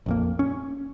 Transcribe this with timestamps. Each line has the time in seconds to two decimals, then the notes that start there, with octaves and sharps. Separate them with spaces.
0.06 A#1 F2 A#3
0.39 C#4